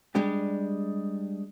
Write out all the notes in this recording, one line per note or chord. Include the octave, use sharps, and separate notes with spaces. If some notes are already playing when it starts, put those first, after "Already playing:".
G3 G#3 D4 G4